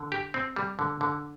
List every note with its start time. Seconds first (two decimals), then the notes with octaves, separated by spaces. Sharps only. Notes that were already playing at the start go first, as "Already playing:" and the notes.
Already playing: D3
0.12 G4
0.34 C4
0.56 G3
0.79 D3
1.01 D3